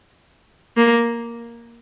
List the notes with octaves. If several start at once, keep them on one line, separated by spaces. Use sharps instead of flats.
A#3